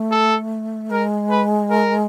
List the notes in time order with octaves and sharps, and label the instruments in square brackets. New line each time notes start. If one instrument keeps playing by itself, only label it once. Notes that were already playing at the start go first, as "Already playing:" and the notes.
Already playing: [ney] A3
[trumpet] A4
[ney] G#3 [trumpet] A#4
[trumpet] B4
A#4